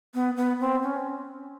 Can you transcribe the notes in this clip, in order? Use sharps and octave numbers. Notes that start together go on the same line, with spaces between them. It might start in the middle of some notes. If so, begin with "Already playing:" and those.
B3
B3
C4
C#4